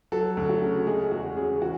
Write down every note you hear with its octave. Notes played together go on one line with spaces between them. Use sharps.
F#3 A4
D2
F#4
C#3
G#3 G#4
E2 F#4
C#3 G#4
E3 F#4